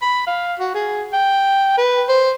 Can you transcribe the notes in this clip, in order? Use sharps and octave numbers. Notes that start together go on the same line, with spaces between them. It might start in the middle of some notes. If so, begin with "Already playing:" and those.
B5
F5
F#4
G#4
G5
B4
C5